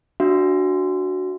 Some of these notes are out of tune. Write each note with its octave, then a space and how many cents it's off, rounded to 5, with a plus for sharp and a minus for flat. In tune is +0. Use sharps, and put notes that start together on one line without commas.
D4 +0 F#4 +0 E5 +30